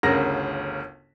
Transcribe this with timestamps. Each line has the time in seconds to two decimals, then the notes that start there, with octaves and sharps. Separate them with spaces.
0.03 G1 D2 C#3 A#4 A#6